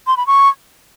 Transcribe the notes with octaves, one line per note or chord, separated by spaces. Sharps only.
C6
B5
C#6